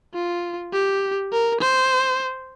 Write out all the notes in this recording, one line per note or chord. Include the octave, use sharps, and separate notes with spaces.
F4
G4
A#4
C5